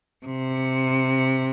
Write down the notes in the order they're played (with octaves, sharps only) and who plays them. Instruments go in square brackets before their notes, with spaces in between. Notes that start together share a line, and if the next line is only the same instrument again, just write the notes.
[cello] C3